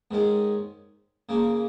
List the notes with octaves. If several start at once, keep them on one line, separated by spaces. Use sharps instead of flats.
G#2 D#3 G#3 C#4
C#3 A#3 C#4